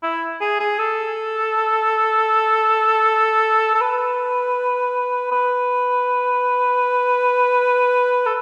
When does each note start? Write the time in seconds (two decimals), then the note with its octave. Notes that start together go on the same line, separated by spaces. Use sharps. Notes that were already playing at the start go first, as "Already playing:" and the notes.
0.03 E4
0.41 G#4
0.60 G#4
0.79 A4
3.75 A4
3.81 B4
5.32 B4
8.26 A4